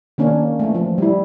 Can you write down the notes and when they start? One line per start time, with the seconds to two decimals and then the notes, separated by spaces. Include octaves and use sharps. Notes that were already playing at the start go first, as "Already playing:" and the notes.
0.18 D#3 A#3 C#4 D4
0.59 E3 A3
0.75 F3
0.98 G3 E4